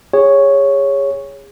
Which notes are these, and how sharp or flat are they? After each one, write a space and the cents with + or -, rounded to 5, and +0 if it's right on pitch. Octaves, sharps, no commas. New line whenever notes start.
G#4 -30 C#5 +0